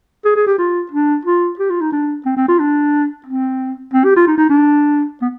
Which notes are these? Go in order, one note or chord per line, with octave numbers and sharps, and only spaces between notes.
G#4
G#4
G4
F4
D4
F4
G4
F4
D#4
D4
C4
C4
F4
D4
C4
C4
G4
F4
D#4
D#4
D4
B3